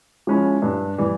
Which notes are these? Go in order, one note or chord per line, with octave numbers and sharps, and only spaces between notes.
F3 G#3 C#4 E4
G2
E3 G3